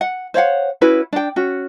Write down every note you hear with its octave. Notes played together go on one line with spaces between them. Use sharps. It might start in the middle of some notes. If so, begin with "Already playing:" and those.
F#5
C5 C#5 F5 F#5
C#4 E4 F#4 B4
D4 G5
C#4 F#4